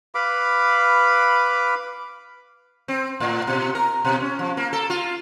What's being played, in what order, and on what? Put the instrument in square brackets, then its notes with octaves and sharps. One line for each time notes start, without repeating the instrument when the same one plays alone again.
[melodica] B4 F5 B5 D6
[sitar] C4
A2
B2
A#4
B2
C#4
F3
A#3
A4
F4